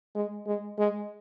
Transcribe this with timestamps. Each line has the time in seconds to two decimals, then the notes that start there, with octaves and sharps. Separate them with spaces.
0.16 G#3
0.47 G#3
0.79 G#3